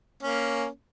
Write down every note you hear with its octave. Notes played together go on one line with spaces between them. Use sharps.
A#3 C#4